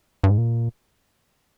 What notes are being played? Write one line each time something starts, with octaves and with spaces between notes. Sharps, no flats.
G2
G#2
A#2